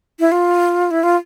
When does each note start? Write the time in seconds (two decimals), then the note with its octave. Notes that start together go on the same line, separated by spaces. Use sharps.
0.20 E4
0.32 F4
0.91 E4
1.03 F4